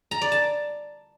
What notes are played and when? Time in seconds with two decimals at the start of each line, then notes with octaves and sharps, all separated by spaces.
0.11 A#5
0.22 D5
0.32 A5